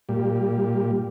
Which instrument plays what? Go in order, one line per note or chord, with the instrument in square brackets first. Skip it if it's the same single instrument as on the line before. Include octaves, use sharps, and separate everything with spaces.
[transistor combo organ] A#2 G3